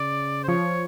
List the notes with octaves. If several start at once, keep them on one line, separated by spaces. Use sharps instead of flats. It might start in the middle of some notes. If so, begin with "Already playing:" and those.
Already playing: C#3 D5
C5
F3 C#5